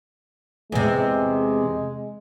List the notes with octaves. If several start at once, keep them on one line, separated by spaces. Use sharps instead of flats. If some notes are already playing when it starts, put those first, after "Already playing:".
E2 C3 G#3